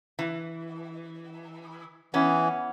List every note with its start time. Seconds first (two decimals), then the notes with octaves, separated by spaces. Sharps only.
0.19 E3
2.14 E3 B3 C#4